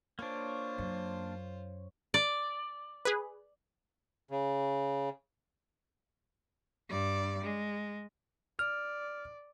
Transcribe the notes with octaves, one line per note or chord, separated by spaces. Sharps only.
A#3 D4 F4 C5 C#5
F#2
D5
G#4 B4
C#3
G2 D5
G#3
D5 F6